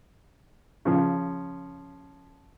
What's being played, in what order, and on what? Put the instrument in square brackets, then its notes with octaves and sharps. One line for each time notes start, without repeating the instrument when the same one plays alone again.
[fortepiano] C#3 F3